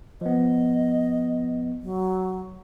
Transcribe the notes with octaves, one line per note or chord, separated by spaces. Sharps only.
F3 B3 D#5
F#3